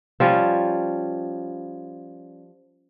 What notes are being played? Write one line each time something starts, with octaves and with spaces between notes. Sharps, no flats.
F3 G3 C#4